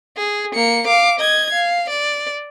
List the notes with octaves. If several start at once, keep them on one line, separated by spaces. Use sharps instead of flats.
G#4
A#3 C#7
F5 D6
D#5 G#6
F5
D5